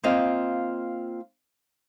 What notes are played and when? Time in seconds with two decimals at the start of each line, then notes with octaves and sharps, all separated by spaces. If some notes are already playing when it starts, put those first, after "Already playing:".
0.03 A#3 C4 F4 D#5 F5